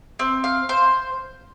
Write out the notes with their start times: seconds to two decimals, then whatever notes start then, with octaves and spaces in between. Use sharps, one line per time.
0.19 C4
0.44 F5
0.69 C5